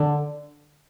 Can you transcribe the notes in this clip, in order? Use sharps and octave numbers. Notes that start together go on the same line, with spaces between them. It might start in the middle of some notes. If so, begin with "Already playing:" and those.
Already playing: D3